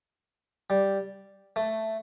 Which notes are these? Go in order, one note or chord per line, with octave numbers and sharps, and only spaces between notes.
G3
A3